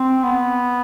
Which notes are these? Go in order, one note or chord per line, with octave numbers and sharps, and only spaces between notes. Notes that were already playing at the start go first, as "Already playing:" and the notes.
Already playing: C4
B3